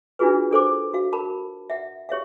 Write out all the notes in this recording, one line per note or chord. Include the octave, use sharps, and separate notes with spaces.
D4 D#4 F4 F#4 G#4 B4
D4 A4 C5 D6
F#4 F5
A#4 A5 B5
E5 F#5
G4 C#5 E5 F5